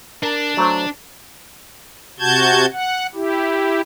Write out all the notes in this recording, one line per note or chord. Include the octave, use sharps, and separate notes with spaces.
D4 A#4 A5
F#3 A3 C5
C3 F#4 A5 G6 G#6
F#5
E4 G4